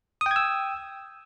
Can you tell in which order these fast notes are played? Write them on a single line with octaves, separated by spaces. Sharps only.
D#6 G5 G#6 E6